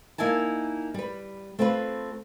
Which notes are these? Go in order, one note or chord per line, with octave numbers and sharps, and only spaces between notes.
A#3 D#4 E4 G#5 A5
G3 B4
A3 C4 F4 A4 B4